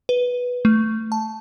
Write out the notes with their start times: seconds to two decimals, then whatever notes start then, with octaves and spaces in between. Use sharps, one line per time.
0.09 B4
0.65 A3
1.12 A5